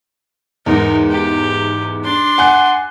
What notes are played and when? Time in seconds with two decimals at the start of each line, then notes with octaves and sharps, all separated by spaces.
0.66 E2 G#2 D#4 A#4
1.10 G4
2.04 D4 C6
2.38 F#5 G#5 F#6